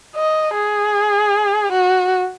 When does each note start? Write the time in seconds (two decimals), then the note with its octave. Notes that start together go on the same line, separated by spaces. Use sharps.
0.15 D#5
0.55 G#4
1.72 F#4